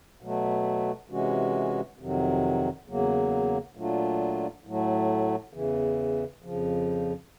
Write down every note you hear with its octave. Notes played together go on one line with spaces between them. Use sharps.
B2 F#3 A3
C3 E3 G#3 C#4 F#4
F2 C3 D#3 F#3
E2 C#3 F#3 A#3
A#2 F#3 A3 D4 F4
A2 F#3 A3
E2 C#3 E3
F2 C#3 F3